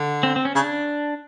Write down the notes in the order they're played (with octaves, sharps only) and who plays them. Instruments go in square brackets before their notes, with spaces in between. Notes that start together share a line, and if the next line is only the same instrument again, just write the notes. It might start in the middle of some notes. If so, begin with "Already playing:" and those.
Already playing: [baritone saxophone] D3
[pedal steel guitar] C4
C4
C#4
[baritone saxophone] C#3 [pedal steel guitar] D4